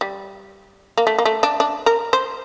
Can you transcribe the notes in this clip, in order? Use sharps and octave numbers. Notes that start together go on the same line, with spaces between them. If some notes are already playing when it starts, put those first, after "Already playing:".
G3
A#3
A3
A#3
A3
D4
D4
A#4
C5